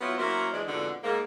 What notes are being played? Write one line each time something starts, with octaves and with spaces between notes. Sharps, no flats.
F#3 B3 E4 F4 C5 C#5
F#3 A#3 C#4 E4 C5
E3 G#3 D4
F2 G#2 B2 D3
G#2 A#3